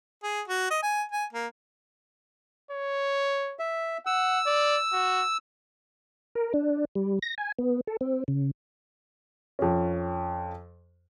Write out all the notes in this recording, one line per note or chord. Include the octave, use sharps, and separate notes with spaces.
G#4
F#4
D#5
G#5
G#5
A#3
C#5
E5
F#5 E6
D5
F#4
A#4
D4
G3
A#6
G#5
B3
A4
C4
C#3
F2 C#4